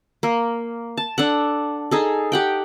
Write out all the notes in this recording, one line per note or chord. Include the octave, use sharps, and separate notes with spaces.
A#3
A5
D4 A4 F#5
D#4 G#4 A4
G4 F#5 G5